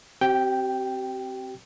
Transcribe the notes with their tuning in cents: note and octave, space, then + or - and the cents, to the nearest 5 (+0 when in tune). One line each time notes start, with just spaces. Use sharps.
C4 +5 G4 -40 G5 +0